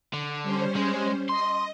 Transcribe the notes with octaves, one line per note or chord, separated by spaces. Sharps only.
D3
G3 C#4 C5
G#3
D#5 C6